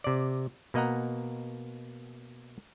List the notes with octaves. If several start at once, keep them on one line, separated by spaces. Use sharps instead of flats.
C3 D5
B2 A#3 D#5 F#5 A#5